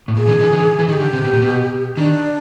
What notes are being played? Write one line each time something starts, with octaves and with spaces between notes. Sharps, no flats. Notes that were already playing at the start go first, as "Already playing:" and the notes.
A2
A#2 G#4
D3 E3
D3 E3
D3 E3
E3
D#3 G#4
G4
D3
C3
B2
A#2
B2
D#3 D4